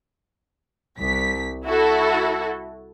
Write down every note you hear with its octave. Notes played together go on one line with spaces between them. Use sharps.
C2 B6
E4 F#4 A4